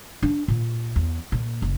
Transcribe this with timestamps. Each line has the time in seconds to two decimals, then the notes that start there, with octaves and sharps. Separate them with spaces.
0.22 D4
0.48 A#2
0.96 E2
1.32 A#2
1.62 F#1